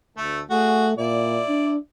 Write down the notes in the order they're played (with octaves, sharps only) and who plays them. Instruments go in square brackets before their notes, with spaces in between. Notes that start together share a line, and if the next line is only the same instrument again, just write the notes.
[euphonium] D2 [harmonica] A3
[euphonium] A3 [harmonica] F#4 G#4
[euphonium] A#2 [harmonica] E4 D5
[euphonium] D4